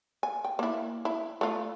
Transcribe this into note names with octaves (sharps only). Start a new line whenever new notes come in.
G#5
G5
A#3 E4
E4
A3 F4